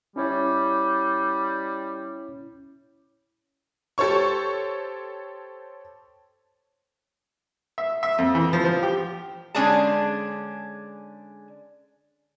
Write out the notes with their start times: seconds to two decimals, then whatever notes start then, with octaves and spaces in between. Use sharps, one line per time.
0.16 G3 C#4 E4 C#5
3.98 G4 A4 C5 C#5 C#6
7.78 E5
8.03 E5
8.18 F2
8.35 E3
8.53 F3
8.65 F3
8.83 G4
9.55 D3 G#3 C#4 D4 G#4 A5